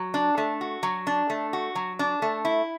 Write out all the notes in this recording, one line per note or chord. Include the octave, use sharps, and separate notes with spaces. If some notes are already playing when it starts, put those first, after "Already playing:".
Already playing: F#3
D4
A3
F#4
F#3
D4
A3
F#4
F#3
D4
A3
E4